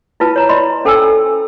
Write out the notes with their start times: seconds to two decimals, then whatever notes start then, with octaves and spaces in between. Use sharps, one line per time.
0.20 E4 F4 B4 A5
0.36 C#5 A#5
0.49 D5 D#5 B5 C6
0.85 C#4 A4 C5 G5 G#5 E6